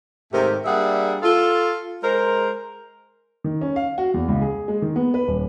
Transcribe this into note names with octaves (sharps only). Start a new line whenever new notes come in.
G#2 C3 D#3 A3 G4 A#4
G3 A#3 D4 G#4 E5 F#5
F4 A4
G#3 A#4 C5
D#3
C#4
F5
F#4
E2
C#2
G#4
G#3
D#3
B3
B4
D#1